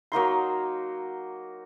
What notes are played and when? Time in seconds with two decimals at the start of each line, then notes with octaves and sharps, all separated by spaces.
0.12 F#3 A#3 D#4 C6